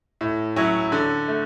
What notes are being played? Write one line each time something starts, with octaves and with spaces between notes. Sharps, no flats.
A2
F#3 C#4 E4
D3
A3